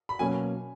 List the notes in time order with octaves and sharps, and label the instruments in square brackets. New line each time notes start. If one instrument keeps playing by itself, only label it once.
[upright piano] B5
[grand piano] B2 F#3 A#3 C#4 [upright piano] G#5